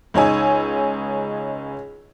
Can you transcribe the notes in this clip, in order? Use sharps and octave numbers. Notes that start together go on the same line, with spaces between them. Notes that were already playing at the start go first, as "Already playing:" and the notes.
C#2 D#4 C#5 G#5 E6